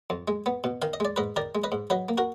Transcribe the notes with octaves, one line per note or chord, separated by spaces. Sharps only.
F2
G#3
B3
B2
D#3 F5
D#5
G#3 D5
G#2 B4 D#5
D#3 A#4 D5
G#3
B4 D#5
G#2
F#3 B4 D#5
A#3
F#4 A#4